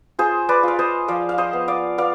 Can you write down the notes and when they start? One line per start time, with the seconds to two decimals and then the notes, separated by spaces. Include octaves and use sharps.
0.19 F4 G#4 C5
0.49 B4 D5
0.63 F4 F5
0.79 C5 D#5
1.08 F3 D5 F5
1.29 F5
1.38 C5 D#5
1.53 B3
1.68 D5 F5
1.98 B3 D5 F5